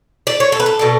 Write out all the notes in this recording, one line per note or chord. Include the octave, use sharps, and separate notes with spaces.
D5
C#5
A4
B4
A4
B2 A3 D4